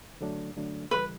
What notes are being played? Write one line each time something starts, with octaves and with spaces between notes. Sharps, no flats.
D3 F#3 A3 D4
D3 F#3 A3 D4
C#3 E3 G3 B4